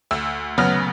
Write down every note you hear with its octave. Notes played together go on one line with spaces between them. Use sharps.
D2 E6
C#3 F#3 B3 F6